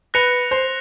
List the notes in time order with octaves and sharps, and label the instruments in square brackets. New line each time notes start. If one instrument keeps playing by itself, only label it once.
[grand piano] B4 [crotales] F#6 A#6 C#7 F7
[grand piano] C5